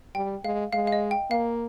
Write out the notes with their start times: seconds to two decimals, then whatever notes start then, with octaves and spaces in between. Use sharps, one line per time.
0.15 G3 G5
0.44 G#3 F5
0.73 G#3 F5
0.87 F5
0.92 D#5
1.11 G5
1.31 A#3 F5